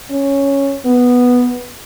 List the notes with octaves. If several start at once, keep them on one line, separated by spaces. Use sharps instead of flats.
C#4
B3